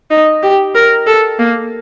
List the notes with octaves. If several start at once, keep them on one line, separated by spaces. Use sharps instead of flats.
D#4
G4
A#4
A4
A#3